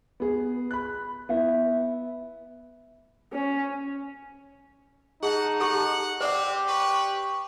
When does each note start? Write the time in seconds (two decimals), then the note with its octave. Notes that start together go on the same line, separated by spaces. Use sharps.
0.20 B3 G#4
0.71 B5 F#6
1.29 B3 E4 E5
3.33 C#4
5.23 D#4 G#4 F#5 A5
5.60 G4 A4 F#5 C#6
6.21 C4 G4 C5 D5 F#5 D6
6.68 B4 C#6